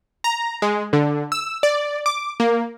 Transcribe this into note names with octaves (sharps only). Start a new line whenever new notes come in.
A#5
G#3
D3
E6
D5
D6
A#3